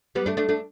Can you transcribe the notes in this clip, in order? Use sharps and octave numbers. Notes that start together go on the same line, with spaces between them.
G3 B3
A3 D4
A3 D4
A3 D4